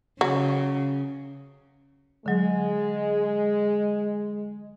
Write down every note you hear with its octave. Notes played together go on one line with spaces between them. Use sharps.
C#3 F#3
D3 F#3 G#3